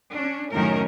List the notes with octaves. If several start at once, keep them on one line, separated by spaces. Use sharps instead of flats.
C#4 D4
F#2 A2 D#3 C#4 A#4